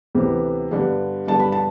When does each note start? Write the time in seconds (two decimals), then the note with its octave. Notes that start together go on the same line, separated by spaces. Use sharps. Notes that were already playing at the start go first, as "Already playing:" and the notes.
0.15 D2 C3 E3 B3
0.71 G2 D3 G3 B3
1.28 G2 D3 G3 B3 A5
1.40 B5
1.52 A5